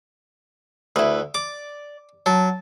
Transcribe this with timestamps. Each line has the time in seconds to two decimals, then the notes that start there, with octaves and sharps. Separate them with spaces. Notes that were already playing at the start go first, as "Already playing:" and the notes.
0.96 D2 E4 B4
1.34 D5 D6
2.26 F#3 A5